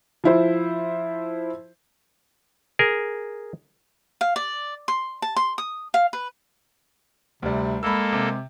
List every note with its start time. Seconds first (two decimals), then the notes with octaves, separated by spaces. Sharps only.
0.24 F3 E4 C5
2.79 G#4 A#4
4.21 F5
4.36 D5
4.88 C6
5.22 A5
5.36 C6
5.58 D#6
5.94 F5
6.13 B4
7.42 D2 C3 G3
7.83 G#3 A#3 A4 B5 E6
8.12 C3